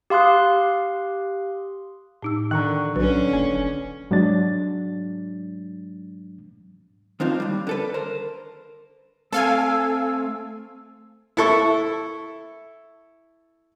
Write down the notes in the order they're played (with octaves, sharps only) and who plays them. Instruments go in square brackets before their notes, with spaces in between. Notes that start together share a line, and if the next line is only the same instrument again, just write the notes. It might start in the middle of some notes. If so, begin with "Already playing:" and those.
[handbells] G4 F5 C6 D#6 F#6
[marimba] A2 D#4 E6
[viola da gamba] D3 [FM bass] D#3 [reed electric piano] A#5 C#6 F#6
[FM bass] B1 [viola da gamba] D3 C#4 [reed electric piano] F#3 [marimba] B4
[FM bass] F#1 [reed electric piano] G#5
[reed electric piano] G#2 F#3 G#3 D4 A6
[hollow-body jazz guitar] D#3 F3 C4 D4 D#4 F4
D#2 G3
D3 A4 B4
A#4 C5
[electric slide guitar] A3 C4 [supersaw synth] A4 F5 G#5 [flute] E6
[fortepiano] E4 A4 C#6